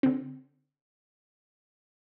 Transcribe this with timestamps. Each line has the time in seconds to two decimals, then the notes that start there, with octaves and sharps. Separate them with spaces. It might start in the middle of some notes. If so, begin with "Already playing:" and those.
0.03 D3 C4